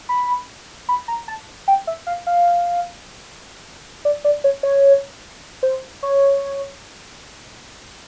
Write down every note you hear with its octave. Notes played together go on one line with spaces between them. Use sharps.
B5
B5
A#5
A5
G5
E5
F5
F5
D5
D5
C#5
C#5
C5
C#5